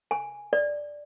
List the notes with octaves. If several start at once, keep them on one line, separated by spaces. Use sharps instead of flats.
G#5
D5